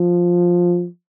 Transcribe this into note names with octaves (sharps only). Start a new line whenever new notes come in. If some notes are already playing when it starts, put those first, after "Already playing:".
Already playing: F3